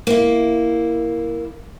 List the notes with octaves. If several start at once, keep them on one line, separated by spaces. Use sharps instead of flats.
A#3 E4